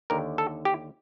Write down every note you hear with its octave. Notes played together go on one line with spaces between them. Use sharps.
D#2 D3 A#4
A4
G4